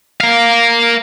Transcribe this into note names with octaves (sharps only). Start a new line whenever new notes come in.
A#4 F5